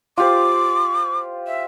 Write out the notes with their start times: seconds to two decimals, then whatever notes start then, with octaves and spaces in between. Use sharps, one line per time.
0.18 F4 G4 C5 D6
1.47 E5